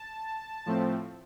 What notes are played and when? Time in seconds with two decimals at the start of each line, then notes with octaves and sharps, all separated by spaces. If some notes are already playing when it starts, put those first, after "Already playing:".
Already playing: A5
0.66 A2 F3 A3 C4